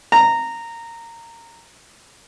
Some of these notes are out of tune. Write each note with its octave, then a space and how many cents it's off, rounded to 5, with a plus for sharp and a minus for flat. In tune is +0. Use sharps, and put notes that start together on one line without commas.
A#5 -15